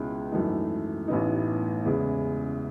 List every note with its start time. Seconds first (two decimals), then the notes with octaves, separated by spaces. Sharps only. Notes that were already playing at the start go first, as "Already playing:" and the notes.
Already playing: C#2 B2 G#3 C#4 E4
0.32 G#1 F#2 E3 A3 D#4
1.08 A1 A2 E3 B3 D#4
1.85 E2 C#3 G#3 C#4 E4